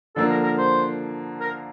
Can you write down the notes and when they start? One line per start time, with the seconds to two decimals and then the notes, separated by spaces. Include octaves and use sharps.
0.16 D3 F3 A#3 A4
0.30 A#4
0.44 A#4
0.58 C5
1.41 A#4